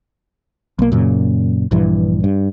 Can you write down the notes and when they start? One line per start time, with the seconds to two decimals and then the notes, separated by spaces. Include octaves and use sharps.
0.79 B1 A#3
0.92 F#2 A#2 C#3
1.71 A#1 G2 E3
2.24 G2